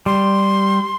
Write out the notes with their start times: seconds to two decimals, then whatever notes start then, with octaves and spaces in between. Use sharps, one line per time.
0.06 G3 C6